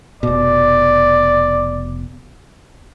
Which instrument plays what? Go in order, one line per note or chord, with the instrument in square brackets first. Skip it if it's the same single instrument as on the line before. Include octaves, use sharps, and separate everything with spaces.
[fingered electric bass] F1 B2 [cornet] D5